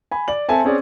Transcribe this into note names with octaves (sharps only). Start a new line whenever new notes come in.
G#5 B5
D5 F#7
C4 A4 E5 G#5 A5
C4 C#4 G#4 D5